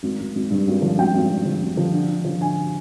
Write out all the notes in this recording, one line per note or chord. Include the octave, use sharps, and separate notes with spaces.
G#1
G#1
G#1
G2
G#1
F3
G#1 G5
G#1
G#1
F3
G#1
F3
D3
D3
F3
D3 G#5